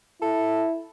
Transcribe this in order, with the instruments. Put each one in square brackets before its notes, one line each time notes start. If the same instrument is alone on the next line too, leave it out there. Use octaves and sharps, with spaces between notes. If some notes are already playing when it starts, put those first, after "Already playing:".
[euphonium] E4 [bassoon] A4